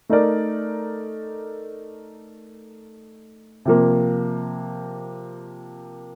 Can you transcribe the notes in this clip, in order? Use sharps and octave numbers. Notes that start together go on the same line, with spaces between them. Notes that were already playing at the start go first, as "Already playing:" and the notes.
A3 D#4 A#4 D5
C3 F3 A#3